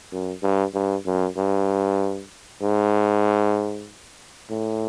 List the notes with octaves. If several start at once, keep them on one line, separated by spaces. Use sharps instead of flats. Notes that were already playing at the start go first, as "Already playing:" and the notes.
F#2
G2
G2
F#2
G2
G#2
A2